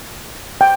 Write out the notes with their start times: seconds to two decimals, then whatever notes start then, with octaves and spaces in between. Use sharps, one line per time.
0.61 G5